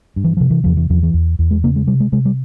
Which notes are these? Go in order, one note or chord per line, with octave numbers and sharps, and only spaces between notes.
G2
E3
C3 F3
E3
E2 F3
E3
E2 F3
E3
E2
E2
G#3
C#3 A#3
G#3
C3 G3
G#3
C3 G#3
G3